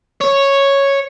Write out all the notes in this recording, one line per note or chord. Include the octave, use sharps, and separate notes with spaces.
C#5